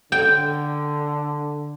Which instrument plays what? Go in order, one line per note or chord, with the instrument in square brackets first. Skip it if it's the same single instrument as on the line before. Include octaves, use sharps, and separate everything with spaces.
[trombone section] D3 [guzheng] G5